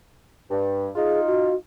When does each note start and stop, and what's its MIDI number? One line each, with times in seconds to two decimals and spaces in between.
0.50 0.88 43
0.95 1.52 63
0.95 1.52 65
0.95 1.20 68
1.27 1.55 66